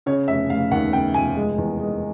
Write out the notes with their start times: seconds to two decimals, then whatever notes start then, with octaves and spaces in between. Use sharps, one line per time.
0.06 C#3 C#5
0.28 F1 E5
0.50 F1 F5
0.71 D#2 F#5
0.93 C#3 G5
1.14 F1 G#5
1.36 G#3
1.58 E2
1.80 G#3